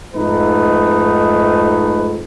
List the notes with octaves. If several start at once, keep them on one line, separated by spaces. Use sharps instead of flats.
F2 G#2 A3 D#4 B4